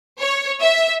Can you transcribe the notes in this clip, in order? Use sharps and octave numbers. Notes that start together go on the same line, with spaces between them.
C#5
E5